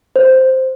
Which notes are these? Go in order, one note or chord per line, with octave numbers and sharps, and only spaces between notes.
C5